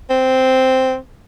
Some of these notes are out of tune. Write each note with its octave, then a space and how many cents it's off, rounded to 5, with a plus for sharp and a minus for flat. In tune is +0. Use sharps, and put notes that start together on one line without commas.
C4 -5